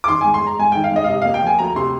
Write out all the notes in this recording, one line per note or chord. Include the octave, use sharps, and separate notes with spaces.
D6
D#3 C6
G#5
G#2
C6
G#3 A#5
G#2 G#5
D#3 G5
F5
G#2 D#5
F5
C3 D#5
F5
A#3
G5
F3 G#5
D2 A#5
C3 C6